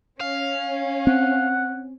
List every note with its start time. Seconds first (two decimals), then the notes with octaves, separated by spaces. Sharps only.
0.21 C#4 F5
1.07 C4 F#5